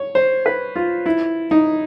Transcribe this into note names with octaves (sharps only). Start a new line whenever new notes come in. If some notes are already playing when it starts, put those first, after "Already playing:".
Already playing: C#5
C5
B4
F4
E4
D#4